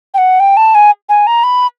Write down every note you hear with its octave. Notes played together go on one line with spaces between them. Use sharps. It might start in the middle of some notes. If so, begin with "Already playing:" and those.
G5
F#5
G5
A5
G#5
G#5
A#5
B5